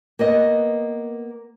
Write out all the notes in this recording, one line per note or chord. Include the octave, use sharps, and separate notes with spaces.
A#3 B3 D#5